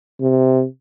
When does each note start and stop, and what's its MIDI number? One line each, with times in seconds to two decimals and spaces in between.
0.21 0.65 48